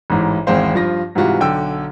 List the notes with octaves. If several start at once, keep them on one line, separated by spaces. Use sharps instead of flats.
A1 G#2 E3
G#1 E2 G#3 C4 C5 F5
G2 F3 F4 A#6
G#2 C3 E3 G3 F4 F#4
B1 D3 G5 E6